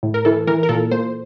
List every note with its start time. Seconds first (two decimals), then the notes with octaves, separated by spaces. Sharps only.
0.03 A2
0.14 A#4
0.25 E3 A4
0.47 E3 A#4
0.63 A#4
0.69 A#2 A4
0.91 A#2 C5